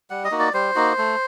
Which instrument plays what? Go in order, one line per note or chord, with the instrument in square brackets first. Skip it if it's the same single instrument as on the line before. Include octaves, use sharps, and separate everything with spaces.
[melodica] G3 F#5
D#5
A#3 D#4 F#4
D5
G3 C5
A#3 D#4 F#4
A3